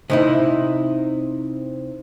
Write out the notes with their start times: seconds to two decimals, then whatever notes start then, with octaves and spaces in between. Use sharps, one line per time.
0.10 C3 D#4 E4